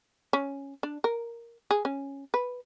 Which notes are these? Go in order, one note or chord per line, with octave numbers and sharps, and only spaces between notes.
C#4
D4
A#4
G#4
C#4
B4